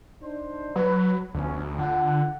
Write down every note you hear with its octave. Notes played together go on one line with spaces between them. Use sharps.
D4 D#4 C5
F#3 B4
D2 B2 F3 C#4
D3 F4 F#5